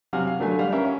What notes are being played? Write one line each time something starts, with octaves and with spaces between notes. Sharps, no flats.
C3 F#3 F5 F#5 G#5 F6
F5
D3 F#3 A3 G#5
G3 F5 F#5
C#4 A#4 E5
C#4